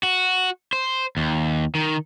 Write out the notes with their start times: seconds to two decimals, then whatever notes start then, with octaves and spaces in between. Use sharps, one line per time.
0.03 F#4
0.73 C5
1.17 D#2
1.75 D#3